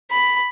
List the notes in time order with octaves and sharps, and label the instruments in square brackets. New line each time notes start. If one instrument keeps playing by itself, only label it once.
[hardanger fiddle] B5